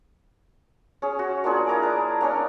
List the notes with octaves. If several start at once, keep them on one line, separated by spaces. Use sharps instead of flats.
C#4 G#4
F#4
A#3 D4 F4 G#4
E4 A#4 A#5 D6
D4
A#3 C#4 D4